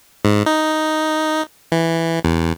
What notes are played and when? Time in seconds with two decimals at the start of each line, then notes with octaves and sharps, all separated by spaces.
0.25 G#2
0.46 D#4
1.72 E3
2.24 E2